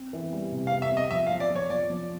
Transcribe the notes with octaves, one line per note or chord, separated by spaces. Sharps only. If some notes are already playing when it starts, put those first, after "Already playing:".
Already playing: C4
E3
G3
C3
F5
C4
E5
C4
D#5
F3 E5
F5
F3
D5
F3
C#5
F3 D5
F3